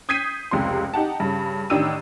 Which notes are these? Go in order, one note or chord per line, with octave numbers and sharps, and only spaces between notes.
D#6 G6 G#6 B6 C7 D#7
F1 C#2 C3 C6
D#4 G4 F#5 A5
G2 C#3
A1 D#3 D4 G4 E6 D#7